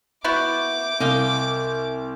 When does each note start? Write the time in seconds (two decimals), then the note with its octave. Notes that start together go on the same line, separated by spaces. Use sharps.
0.24 B3 E4 F#4 E5 D6 G6
1.00 C2 D#5 F5 G5